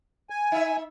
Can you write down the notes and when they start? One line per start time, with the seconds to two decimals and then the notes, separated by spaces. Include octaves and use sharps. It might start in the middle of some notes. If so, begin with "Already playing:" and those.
0.30 G#5
0.52 D#4 E5